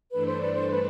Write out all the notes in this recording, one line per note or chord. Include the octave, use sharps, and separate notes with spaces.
G2 E3 A3 D4 A4 B4
C5
B4 D5
C5
B4